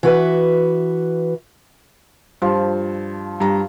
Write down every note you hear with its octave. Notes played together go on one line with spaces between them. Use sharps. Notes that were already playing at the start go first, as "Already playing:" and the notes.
E3 F#4 B4 E5
G2 F3
G2 A#5